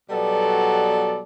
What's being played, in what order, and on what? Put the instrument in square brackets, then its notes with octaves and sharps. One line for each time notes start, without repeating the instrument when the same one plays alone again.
[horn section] B2 F#3 G3 B3 A4 D5